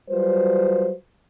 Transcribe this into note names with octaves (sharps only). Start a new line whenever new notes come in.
F#3 G3 F4 B4 C5